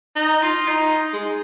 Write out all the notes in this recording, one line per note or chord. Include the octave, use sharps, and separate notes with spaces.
D#4
F4
D#4
G#3